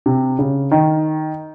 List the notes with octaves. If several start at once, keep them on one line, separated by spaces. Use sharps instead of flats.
C3
C#3
D#3